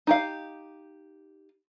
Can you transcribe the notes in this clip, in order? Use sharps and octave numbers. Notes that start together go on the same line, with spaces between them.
D#4 G4 F5